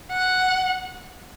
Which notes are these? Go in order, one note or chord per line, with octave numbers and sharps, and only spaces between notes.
F#5